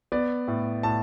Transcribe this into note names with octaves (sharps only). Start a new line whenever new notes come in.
B3 D5
A2
A2 A5